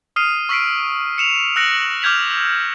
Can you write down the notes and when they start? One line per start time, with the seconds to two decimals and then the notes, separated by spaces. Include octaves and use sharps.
0.16 D#6 F6 C7 D#7
0.49 C#6 E6 B6 C7 D7
1.18 C#7 E7 F7
1.56 E6 F#6 A#6 C#7 D7 F#7
2.02 D6 F6 G6 G#6 B6 F7